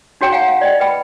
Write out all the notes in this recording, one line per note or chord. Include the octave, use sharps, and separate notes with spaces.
D#4 F#4 C#5 G5 G#5 A#5
F5 F#5 G#5 A#5
F5
D5 D#5 G5
B4 G5 B5